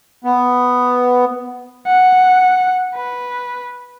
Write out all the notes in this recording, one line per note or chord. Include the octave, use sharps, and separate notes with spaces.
B3
F#5
B4